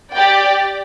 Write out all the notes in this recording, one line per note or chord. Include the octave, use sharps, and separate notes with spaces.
G4 D5 G5